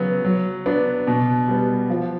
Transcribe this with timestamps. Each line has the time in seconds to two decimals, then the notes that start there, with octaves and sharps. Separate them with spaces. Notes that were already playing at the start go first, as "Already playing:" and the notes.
Already playing: C#3 F#3 B3
0.25 F#3
0.66 B3 D4
1.07 B2
1.48 G3 B3
1.90 F3